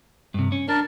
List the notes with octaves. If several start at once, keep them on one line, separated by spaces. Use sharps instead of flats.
G2 C3
C#4
D4 A#4 A5